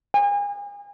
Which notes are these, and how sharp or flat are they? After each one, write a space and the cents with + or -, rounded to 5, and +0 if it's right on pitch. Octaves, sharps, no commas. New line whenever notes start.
G#5 -35